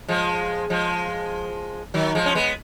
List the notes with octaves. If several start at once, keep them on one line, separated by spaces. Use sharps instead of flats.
F3 G#3
F3 G#3
D#3 F#3
F3 G#3
C#4
G#3 B3